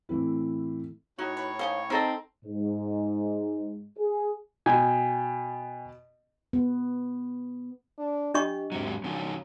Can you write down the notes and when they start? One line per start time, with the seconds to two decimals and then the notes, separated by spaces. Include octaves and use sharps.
0.09 A2 E3 C4 E4
1.19 A2 D#4 F#4 C#5 C#6
1.37 B4
1.59 A#3 C#4 D#4 C5
1.90 C4 D#4 A4 A#4 D#5
2.45 G#2
3.98 G#4
4.66 B2 G5 G#5
6.53 B3
7.98 D4
8.34 D4 G4 D#5 C#6
8.72 G#2 C3 F#3
9.04 F3 F#3 C#4 D#4